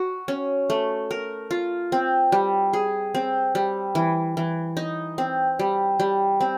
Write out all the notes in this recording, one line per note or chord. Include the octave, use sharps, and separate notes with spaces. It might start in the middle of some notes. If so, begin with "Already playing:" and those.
Already playing: F#4
C#4
A3
A#4
F4
C4
G3
G#4
C4
G3
E3
E3
D#4
C4
G3
G3
C4